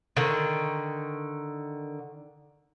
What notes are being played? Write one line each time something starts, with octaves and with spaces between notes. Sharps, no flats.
D3 D#3